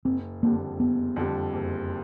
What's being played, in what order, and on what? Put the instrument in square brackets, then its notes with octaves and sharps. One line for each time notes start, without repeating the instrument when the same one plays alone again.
[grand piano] F#1 [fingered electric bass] C4
[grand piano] F2 D3 G3 [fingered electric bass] A#3
[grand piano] F#1 [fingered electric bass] B3
[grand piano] F2 D3 G3
F#1